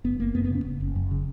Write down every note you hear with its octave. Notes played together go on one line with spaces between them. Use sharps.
F#1 B3
F#1 A#3
F#2 B3
B3
C#3 C#4
F#1
F#1
F#2
C#3